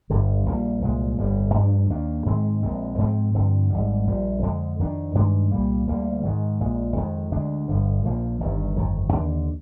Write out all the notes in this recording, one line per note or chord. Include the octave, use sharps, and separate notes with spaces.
G1 G2 D3 G3
A#1 A#2 G3 A#3
C2 A#2 G#3
G1 F2 D3 G3
G2 F3 A#3 D4
D#2 D#3 A#3 D4
G#2 D#3 G#3 C4
A#1 A#2 G#3 C4
G#2 F3 G#3 C4
G2 D3 F3 C4
G#1 G#2 G3
A#1 A#2 G3
F2 D3 G#3
F2 D#3 A#3 D4
G2 D#3 G#3 D4
C2 A#2 G3 A#3
D2 D3 G3 A#3
G#2 D#3 G#3
A#1 A#2 G#3
F2 D#3 G#3
D2 D3 G#3 D4
G1 G2 D3 F3
A#1 A#2 F3 A#3
G1 G2 D#3
G1 F2 D#3
D#2 D3 G3 D4